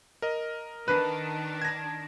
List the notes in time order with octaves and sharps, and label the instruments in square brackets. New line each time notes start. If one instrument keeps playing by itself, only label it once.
[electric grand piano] A#4 D#5
[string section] D#3 D4 [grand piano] B4
[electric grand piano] G#6 A#6